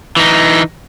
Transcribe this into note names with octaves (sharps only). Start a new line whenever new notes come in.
E3 D#4